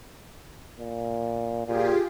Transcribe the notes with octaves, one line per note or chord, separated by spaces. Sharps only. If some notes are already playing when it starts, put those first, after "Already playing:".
A#2
A#2 F4 G4 G#4